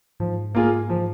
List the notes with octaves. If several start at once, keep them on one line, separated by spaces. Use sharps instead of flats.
G#2 F3
A#3 F4 G#4
F3